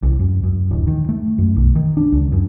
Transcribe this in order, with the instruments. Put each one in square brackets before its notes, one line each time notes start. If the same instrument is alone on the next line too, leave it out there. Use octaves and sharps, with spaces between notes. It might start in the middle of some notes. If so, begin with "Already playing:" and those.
[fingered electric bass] C2
F#2
F#2
D1
D#3
A3
F#2
B1
D#3
D4
C#2
F#2